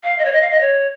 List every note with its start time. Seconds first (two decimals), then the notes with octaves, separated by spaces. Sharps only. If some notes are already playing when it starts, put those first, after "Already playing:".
0.04 F5
0.19 D#5
0.25 C#5
0.32 D#5
0.42 F5
0.51 D#5
0.61 C#5